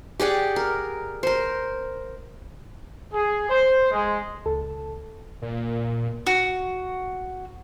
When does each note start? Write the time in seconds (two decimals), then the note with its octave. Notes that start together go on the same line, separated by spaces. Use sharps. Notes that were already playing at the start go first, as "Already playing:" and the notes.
0.20 G4 G#4 D5 F#5
0.56 A#4
1.23 A#4 C5
3.14 G#4
3.50 C5
3.92 G#3
4.46 C#2 A4 A5
5.42 A#2
6.27 F#4